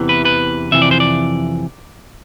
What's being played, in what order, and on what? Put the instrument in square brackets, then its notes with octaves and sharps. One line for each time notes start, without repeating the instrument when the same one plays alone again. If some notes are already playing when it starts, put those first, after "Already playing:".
Already playing: [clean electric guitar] E2 C3 E3
B4
B4
F2 C3 E3 E5
D5
C5
D5